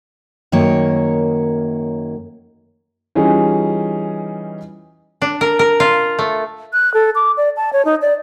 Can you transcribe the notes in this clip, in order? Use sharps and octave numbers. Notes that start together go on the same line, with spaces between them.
F#2 D#3 A#3 C#5
E3 G3 C#4 D#4 F4 G#4
D4
A#4
A#4
F4
A3
F#6
A4
D6
D5
A5
C#5
D#4
D5